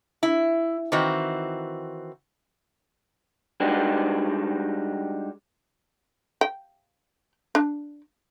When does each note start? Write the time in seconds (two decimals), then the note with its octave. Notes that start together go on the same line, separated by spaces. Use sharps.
0.23 E4
0.92 D#3 E3 C4 F#4
3.60 G3 G#3 D4 D#4 F#4 G4
6.41 G5
7.55 D4